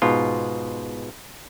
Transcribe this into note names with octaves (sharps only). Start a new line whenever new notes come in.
G#2 B2 F4